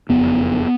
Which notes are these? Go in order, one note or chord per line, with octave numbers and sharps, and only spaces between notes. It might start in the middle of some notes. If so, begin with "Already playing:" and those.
F#1 F2 C#3 B3